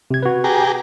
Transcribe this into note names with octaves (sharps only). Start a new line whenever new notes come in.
C3 G#6
F#4 B4
G4 G#4 A#5